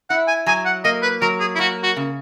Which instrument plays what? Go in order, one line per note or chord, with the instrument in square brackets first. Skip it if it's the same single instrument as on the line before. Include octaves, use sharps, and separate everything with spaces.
[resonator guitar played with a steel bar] E4 [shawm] F#5
[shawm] G#5
[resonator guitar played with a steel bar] F#3 [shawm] G#5
[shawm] F#5
[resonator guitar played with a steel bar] A#3 [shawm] D#5
[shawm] B4
[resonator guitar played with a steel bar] F#3 [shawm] A#4
[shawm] G#4
E4
[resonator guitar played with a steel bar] A#3 [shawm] F#4
[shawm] F#4
[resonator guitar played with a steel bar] C#3